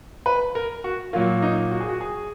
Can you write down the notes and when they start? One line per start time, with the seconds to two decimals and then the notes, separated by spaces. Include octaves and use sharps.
0.26 B4
0.55 A#4
0.84 F#4
1.13 A#2 F#3 A#3 F4
1.42 D#4
1.71 F#4
1.81 G#4
1.89 F#4
2.01 G#4